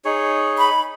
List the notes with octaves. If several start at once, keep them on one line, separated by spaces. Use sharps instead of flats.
D#4 G#4 C#5
B5